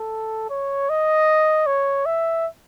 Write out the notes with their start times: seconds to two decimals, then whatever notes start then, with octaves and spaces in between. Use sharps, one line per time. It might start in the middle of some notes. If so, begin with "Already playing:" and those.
Already playing: A4
0.50 C#5
0.89 D#5
1.67 C#5
2.06 E5